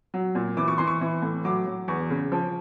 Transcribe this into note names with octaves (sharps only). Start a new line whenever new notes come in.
F#3
A#2
E3 D6
C#6
E3 C6
C#6
E3
A2
F#3 D6
F#3
E2 C#6
C#3
F3